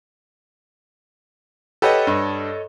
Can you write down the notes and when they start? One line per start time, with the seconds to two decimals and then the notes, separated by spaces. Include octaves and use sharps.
1.82 G4 A4 B4 C#5 D#5 F#5
2.07 G2